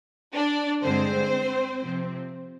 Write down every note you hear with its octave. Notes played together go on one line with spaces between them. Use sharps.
D4 D5
G2 D3 G#3 C4 C5
C3 F3 C4